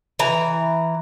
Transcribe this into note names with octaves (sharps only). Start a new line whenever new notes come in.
E3 A#5